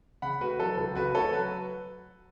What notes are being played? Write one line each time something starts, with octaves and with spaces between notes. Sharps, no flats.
C#3 F#5 B5
A3 F#4 B4
F#3 A4
C#2 A4
C#3 F#4 B4
A3 A4 C#5
F#3 F#4 B4